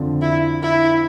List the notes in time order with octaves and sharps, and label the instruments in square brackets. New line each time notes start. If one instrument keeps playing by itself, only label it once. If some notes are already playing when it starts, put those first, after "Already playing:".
Already playing: [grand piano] F2 D3 F3
[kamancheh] E4
E4